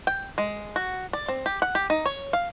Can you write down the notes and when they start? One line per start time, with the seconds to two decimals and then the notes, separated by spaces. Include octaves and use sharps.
0.07 G5
0.38 G#3
0.76 F#4
1.13 D5
1.28 C4
1.46 G4
1.62 F#5
1.75 G4
1.90 D#4
2.06 C#5
2.33 F5